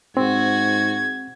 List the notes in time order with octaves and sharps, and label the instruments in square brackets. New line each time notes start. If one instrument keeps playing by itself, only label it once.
[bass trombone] G#2 [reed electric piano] C4 [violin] F#4 [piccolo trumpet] G#6